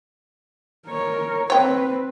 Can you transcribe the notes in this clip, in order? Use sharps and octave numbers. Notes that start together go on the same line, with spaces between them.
A#4 C#5
C4 B4 C#5 G5